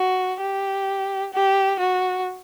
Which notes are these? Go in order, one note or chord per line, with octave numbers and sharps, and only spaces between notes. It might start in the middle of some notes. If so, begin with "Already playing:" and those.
Already playing: F#4
G4
G4
F#4